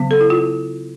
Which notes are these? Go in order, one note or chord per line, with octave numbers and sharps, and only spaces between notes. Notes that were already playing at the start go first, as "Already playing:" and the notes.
Already playing: C#3 F#3 B3
A4
E4
F4